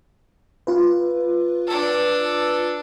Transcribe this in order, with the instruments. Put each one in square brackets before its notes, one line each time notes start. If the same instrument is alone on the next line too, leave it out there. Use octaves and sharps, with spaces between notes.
[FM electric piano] F4 B4
[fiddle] D4 A4